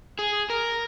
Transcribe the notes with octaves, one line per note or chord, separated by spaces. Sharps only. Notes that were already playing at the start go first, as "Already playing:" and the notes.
G#4
A#4